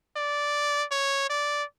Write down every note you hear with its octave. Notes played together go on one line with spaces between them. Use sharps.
D5
C#5
D5